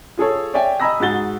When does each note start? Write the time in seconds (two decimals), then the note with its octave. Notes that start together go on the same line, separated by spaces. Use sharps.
0.17 F4 G#4 A4 C#5
0.54 C#5 D5 E5 G5 G#5
0.80 D#5 G#5 A#5 B5 E6 A#6
1.00 G#2 F#4 G#4 A6 G7